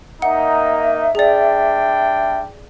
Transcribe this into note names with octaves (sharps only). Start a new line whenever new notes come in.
A#3 D#4 E5 F#5
G3 D4 G#4 D5 G5